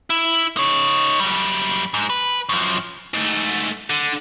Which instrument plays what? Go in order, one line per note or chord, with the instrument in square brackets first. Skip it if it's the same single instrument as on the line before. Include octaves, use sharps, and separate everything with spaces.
[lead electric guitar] E4
D#4 C#5
F#2 G3
G#2
B4
F#2 F3
[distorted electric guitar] G#2 A3
D3